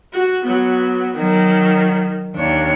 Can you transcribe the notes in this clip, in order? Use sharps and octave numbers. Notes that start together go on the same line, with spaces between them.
F#4
F#3 B3
D#3 F#3
D#2 D4 C#5